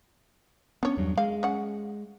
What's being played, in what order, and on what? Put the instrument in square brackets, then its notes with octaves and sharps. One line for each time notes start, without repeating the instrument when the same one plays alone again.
[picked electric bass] B3 C#4 [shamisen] D4 C#5
[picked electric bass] E2 G2 F#3
[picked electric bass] G#3 [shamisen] F5
[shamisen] C#4 F#5